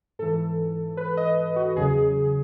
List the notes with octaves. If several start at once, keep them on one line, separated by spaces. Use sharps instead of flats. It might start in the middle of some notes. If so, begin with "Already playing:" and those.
G#2 E3 A4
B4
D#5
F#4
E2 C#3 F#3 G#4